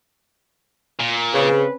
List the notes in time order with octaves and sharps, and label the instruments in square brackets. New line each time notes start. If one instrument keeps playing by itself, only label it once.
[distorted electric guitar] A#2
[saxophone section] C#3 [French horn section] C4 C#4 B4